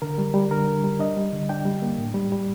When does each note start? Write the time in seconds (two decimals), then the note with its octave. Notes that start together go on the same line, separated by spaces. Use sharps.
0.02 D3 A#4
0.18 G3
0.34 G3
0.51 D3 A#4
0.67 D4
0.84 G3
0.99 D4 D#5
1.17 G3
1.32 D3
1.49 D4 G5
1.65 G3
1.82 A#3
1.98 A2
2.14 G3
2.32 G3